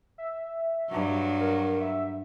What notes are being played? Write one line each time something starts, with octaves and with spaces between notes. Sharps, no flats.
E5
G2 F#3
A#4
E5